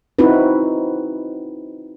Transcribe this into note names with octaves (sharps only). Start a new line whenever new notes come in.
C4 D#4 E4 F#4 B4